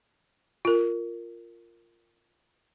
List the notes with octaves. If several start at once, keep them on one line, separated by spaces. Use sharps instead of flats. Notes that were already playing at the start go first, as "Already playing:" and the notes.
F4 A#4